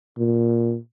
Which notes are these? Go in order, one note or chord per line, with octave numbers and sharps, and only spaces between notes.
A#2